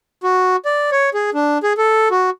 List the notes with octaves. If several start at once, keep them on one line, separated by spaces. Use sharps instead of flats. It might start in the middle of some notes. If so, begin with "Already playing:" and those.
F#4
D5
C#5
G#4
D4
G#4
A4
F#4